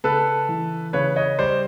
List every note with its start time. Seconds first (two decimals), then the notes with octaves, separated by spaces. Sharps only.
0.04 C#3 A4 B4
0.49 E3
0.93 C#3 B4 C#5
1.16 C#5 D#5
1.39 G3 C5 D5